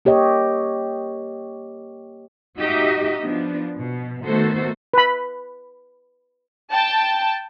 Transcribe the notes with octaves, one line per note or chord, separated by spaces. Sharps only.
A#3 G4 C#5 D#5
D#4 F#4 G4 D#5 E5
F3 B3 D4
B2
D#3 A3 B3 F#4 A4 C5
B4 B5
G5 A5